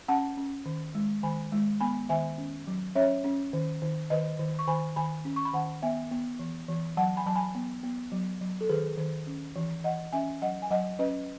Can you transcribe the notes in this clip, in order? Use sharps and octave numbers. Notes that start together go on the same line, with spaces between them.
C#4 F#5 A5
C#4
D#3
G#3
D#3 G#5 B5
G#3
B3 G#5 B5
D#3 E5 G#5
C#4
F#3
C#4 C#5 E5
C#4
D#3
D#3
D#3 B4 D#5
D#3
C#6
D#3 G#5 B5
D#3 G#5 B5
C#4
C#6
B5
D#3 F#5 A5
B3 E5 G#5
B3
E3
E3
F#3 F#5 A5
G#5 B5
F#3 A5
G#5 B5
B3
B3
F#3
F#3
A4
D#3 G#4 B4
D#3
C#4
E3
E3 D#5 F#5
C#4 E5 G#5
F#3 D#5 F#5
G#5
F#3 D#5 F#5
C#4 B4 D#5